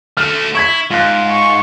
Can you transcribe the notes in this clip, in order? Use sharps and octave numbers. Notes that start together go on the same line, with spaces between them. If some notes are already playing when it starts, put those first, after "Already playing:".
A3 F#4 F6
E4 C#6 G#6 B6
G#2 F4 F#6
C#6